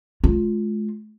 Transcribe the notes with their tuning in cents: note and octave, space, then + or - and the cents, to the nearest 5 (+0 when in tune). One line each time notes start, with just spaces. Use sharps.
G#3 +40 F4 +5